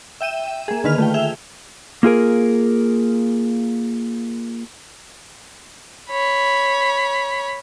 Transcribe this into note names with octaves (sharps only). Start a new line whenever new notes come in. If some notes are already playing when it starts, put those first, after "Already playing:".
E5 G5 D#7 E7
A#3 G#4
D3 D#3 B4 F6 F7
A3 F4 G5
G#4 E5 F7 G7
A#3 F4 G#4 A#4
C#5 B5